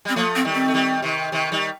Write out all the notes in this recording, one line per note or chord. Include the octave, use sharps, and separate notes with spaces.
G3 C4
F3 A3 A#3
C4
D#3 G3
C4
A3
D#3 G3
C3 D#3
C3 D#3
D#3 G3